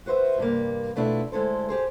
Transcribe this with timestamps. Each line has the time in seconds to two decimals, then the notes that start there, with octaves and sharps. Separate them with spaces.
0.06 F#4 B4 C5 D#5 E5
0.38 G2 C3 G3 A#3
0.96 B2 A3 D4 E4 F4
1.32 D2 G#3 E4 A4 C5
1.69 G4 G#4 C5